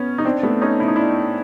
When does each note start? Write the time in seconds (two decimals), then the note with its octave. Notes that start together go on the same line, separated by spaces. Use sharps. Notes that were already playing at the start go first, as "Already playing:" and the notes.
Already playing: B3 C#4
0.18 D#4
0.25 C4 D4
0.43 A3 B3
0.62 C#4 D#4
0.80 E4
0.88 D#4
0.96 D4 E4